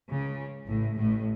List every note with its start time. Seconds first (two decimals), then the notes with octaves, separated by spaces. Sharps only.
0.10 C#2 C#3
0.68 A1 A2
0.97 A1 A2